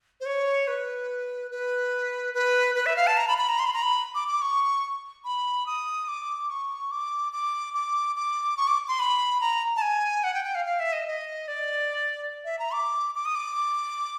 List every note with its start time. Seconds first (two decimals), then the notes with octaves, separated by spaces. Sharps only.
0.21 C5
0.26 C#5
0.68 B4
1.51 B4
2.34 B4
2.75 B4
2.86 E5
2.96 F5
3.07 A5
3.17 A#5
3.28 B5
3.38 B5
3.49 A#5
3.59 C6
3.66 B5
3.74 A#5
3.82 B5
4.15 D6
4.28 D6
4.42 C#6
5.25 B5
5.66 D#6
6.08 D6
6.50 C#6
6.91 D6
7.33 D6
7.74 D6
8.16 D6
8.57 C#6
8.68 D6
8.88 C6
8.99 B5
9.41 A#5
9.76 A5
9.82 G#5
10.24 F#5
10.34 G5
10.44 G5
10.55 F5
10.65 F5
10.80 E5
10.93 D#5
11.07 D#5
11.48 D5
12.45 E5
12.59 A#5
12.73 D6
13.15 D6
13.25 D#6
13.35 D6